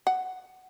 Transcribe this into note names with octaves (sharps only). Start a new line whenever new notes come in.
F#5